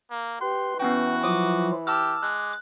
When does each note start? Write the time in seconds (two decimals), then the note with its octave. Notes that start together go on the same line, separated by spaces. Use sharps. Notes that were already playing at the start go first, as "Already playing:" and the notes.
0.11 A#3
0.41 G4 B4 C6
0.80 E3 B3 C#4 F#4 G5
1.23 F3 F#3 F4 D6 D#6
1.87 G4 A5 D6 E6 F6
2.23 G#3 F#6